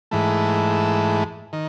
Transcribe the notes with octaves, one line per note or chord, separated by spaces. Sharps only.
G#2 E3 A3
D#3